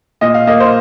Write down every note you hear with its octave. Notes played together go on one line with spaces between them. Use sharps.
A#2 D#5
F5
A#3 D#5
C5